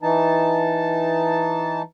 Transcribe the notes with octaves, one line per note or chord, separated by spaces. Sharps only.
E3 D#4 A5